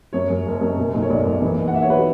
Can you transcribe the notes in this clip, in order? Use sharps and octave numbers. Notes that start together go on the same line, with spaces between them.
F#2 C#5
F#2
F#1
F#2
B2
B1
C#5
B1 D5
B1
E3
A#3
F#5
A#3 E5
C#5
B4
F#4